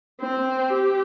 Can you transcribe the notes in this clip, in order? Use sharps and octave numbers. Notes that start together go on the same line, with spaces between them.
C4
G4